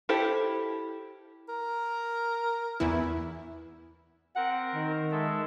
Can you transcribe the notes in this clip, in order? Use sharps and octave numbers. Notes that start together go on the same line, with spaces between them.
E4 G4 A4 C5
A#4
E2 E3 E4
C4 A#4 F#5
D#3
G#3 A4 E5